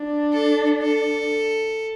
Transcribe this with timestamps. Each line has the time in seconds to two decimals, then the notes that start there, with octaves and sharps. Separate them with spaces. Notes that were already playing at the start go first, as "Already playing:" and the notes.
Already playing: D4
0.32 A4
0.82 A4